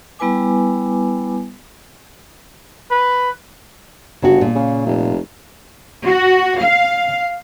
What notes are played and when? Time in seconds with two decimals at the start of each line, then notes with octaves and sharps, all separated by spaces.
0.19 G3 B3 E4 B4 G#5 D6
2.91 B4
4.22 G1 C#3 F#4
4.41 A#2
4.55 C#3
4.86 F1
6.05 F#4
6.60 F5